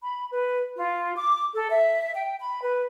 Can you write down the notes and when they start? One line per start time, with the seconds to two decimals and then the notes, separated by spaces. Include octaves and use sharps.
0.03 B5
0.31 B4
0.76 F4
1.16 D6
1.54 A4
1.70 E5
2.14 G5
2.39 B5
2.62 B4